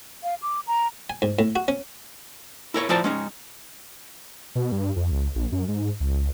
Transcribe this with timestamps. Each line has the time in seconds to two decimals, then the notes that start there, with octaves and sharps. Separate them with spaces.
0.23 F5
0.42 D6
0.67 A#5
1.10 G#5
1.22 G#2
1.39 A2
1.56 F#4
1.68 C#4
2.74 E4 A#4 C#5
2.89 F3 E4 C5 D5 A5 A#5
3.04 G#3 C#4 D#4
4.55 B2
4.72 G2
4.96 F2
5.12 C#2
5.35 A#1
5.52 F#2
5.68 G#2
6.00 C#2